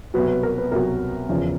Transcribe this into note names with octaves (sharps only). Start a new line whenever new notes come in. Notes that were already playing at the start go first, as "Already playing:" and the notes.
C2 B2 F#3 B4
B4
A#4
B4
C2 B2 F#3 A#4
E2 C#3 F3